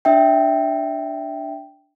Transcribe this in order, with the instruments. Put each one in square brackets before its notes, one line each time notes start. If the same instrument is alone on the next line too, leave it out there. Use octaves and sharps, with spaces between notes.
[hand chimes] D4 E5 G5